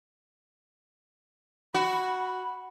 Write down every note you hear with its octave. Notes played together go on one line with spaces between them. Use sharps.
F#4 B5